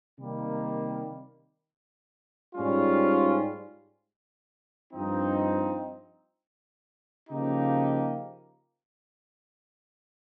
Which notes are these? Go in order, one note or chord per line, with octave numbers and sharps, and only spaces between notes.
C3 D#3 G3 A#3
G#2 G3 C#4 F4
G2 F3 C4 D#4
C#3 F3 A#3 D#4 G4